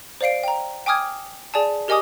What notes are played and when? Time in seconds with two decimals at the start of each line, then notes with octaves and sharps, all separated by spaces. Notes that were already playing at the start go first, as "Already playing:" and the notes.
0.21 C5 D5 F5 C7 D7
0.44 G5 A#5
0.86 G5 G#5 D6 D#6 F6 G#6
1.54 G#4 D5 G#5 A5
1.88 G4 A#4 D#5 G#5 D6 D#6